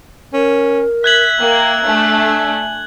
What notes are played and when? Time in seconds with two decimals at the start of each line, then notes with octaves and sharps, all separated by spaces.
0.34 C#4 A#4
1.04 E5 F#6 G#6 B6 F#7
1.40 A#3 G5
1.86 A3 D4 G#5